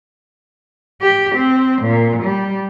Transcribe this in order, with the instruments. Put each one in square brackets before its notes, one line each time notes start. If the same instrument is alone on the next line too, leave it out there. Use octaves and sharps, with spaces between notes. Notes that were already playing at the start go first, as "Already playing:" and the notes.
[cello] G4
C4
A#2
G3